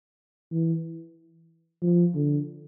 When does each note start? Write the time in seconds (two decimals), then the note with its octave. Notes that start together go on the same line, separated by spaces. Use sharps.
0.52 E3
1.82 F3
2.15 D3